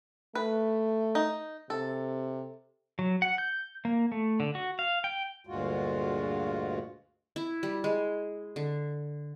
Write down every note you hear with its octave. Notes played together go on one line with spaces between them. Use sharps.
A3 B4
D#4
C3 A4
F#3
F#5
G6
A#3
A3
D3
F#4
F5
G5
D2 G2 A#2 G#3 F4 F#4
E4
G3
G#3
D3